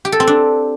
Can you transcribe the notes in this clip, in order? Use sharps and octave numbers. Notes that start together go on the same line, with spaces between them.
G4
A4
C4
D4